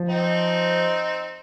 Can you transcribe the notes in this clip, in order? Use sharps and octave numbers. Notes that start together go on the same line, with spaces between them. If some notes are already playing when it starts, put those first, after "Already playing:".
Already playing: F3
C4 D#4